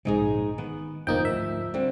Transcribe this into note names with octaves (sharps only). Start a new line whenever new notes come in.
A#1 G#2 C#3 D#4 G#4
D#3 B3
D1 G#1 F#2 F3 A#3 D#4 G5
D2 G#2 E5
D3 G3 C4